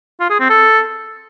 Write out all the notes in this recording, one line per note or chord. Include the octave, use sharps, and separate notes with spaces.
F4
G#4
C4
A4